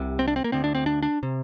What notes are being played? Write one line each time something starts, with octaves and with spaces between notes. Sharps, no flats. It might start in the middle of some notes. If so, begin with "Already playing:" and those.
Already playing: C2 C3
C4
D4
C4
A#3
D2 D3 C4
D4
C4
D4
D4
C3